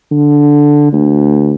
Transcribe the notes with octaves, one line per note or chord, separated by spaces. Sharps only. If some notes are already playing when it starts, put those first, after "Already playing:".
D3
D2